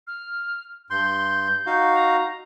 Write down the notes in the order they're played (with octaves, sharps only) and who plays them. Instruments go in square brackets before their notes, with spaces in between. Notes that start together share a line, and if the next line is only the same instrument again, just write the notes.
[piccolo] F6
[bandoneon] G2 C6 [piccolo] G6
[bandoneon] D#4 F#4 F5
[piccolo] A#5